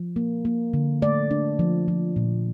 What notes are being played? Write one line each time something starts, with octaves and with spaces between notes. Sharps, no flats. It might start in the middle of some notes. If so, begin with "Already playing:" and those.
Already playing: F3
A#3
A#3
D3
A3 D5
D4
F3
F3
A#2